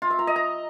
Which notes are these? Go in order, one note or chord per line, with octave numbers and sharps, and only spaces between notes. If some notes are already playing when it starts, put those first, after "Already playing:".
F4
E5
A#5
D#5
A#5